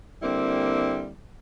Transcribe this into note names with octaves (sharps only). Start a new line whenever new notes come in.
D3 G3 A#3 C4 E4